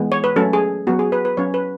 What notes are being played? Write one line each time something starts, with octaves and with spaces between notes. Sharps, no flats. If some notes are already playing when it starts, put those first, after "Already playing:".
Already playing: E3 G#3 B3
C#5
B4
F#3 A3 C#4 A4
G#4
F#3 B3 F#4
G#4
B4
B4
F#3 C#4 C#5
B4